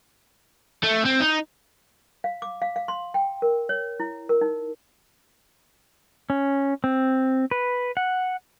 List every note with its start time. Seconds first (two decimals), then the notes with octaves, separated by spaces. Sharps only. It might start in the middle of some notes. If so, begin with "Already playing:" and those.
0.83 A3
1.05 C4
1.20 D#4
2.24 F5
2.42 D6
2.62 F5
2.76 F5
2.88 C6
3.14 G5
3.42 A#4
3.69 C#5
4.00 E4
4.29 A#4
4.41 D#4
6.30 C#4
6.84 C4
7.51 B4
7.97 F#5